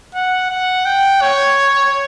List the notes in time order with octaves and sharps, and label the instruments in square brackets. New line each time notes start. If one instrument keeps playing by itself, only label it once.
[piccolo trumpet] F#5
F#5
G5
C#5